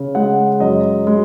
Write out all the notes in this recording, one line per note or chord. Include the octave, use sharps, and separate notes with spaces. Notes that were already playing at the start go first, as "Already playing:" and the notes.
Already playing: C#3
G#3 F#5
F#2 D#5
G#3